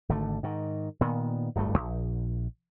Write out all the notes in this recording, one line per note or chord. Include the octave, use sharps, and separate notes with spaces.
G#1 D3 A3
G#2 D#3
A#2 D#3 B3
D1 G1 G2 A3
A#1